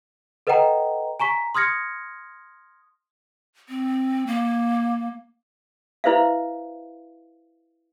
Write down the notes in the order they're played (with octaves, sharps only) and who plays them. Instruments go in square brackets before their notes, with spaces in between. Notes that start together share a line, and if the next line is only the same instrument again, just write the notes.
[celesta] A4 B4 D#5 F#5 G5 A#5
G#5 A#5 C#6 B6
C6 D#6 F6 G#6 A#6 C#7
[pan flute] C4
A#3
[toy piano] E4 B4 C5 E5 F5